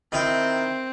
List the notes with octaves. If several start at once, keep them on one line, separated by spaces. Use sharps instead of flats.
D#3 C4 E4